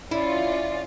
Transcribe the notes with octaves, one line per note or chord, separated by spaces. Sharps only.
C#4 E4 F4 D5